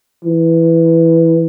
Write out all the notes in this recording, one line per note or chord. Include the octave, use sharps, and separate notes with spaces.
E3